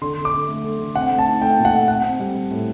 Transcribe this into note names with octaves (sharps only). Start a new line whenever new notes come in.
D3 C6
D3
D6
D3
A3
D3
D3
C4 F#5
A3
A5
D#4
A3 G5
A#2
F#5
A3
C4 F#5
C4
G3
G3
A2